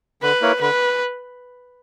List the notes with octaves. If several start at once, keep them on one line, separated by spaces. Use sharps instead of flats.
D3 B4
A#3 E4 A#4 C#5
D3 B4